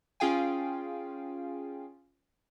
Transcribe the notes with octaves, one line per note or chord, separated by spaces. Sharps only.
C#4 F4 G#4 F5 G5 G#5